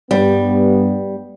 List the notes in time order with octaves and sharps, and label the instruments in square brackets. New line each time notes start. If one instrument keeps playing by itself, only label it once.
[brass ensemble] G2 B3 [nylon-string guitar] G3